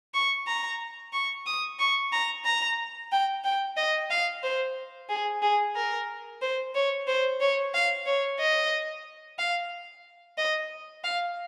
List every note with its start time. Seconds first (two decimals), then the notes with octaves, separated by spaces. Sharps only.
0.14 C#6
0.47 A#5
1.13 C#6
1.46 D#6
1.79 C#6
2.12 A#5
2.45 A#5
3.12 G5
3.44 G5
3.77 D#5
4.10 F5
4.43 C5
5.09 G#4
5.42 G#4
5.75 A#4
6.42 C5
6.75 C#5
7.07 C5
7.41 C#5
7.74 F5
8.06 C#5
8.39 D#5
9.39 F5
10.38 D#5
11.04 F5